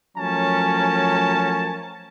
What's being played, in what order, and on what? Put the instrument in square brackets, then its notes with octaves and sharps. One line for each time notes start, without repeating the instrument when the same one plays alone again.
[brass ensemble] F3 F#3 A3 C#4 A#4 A5